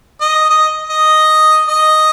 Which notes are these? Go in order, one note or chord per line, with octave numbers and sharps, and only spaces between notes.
D#5
D#5
D#5
D#5